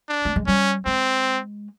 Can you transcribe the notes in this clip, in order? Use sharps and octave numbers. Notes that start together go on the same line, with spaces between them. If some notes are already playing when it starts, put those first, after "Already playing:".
D4
A3
G#3
G3 C#4
G#3 C4